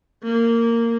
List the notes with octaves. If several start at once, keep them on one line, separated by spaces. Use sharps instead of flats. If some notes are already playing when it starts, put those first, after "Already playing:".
A#3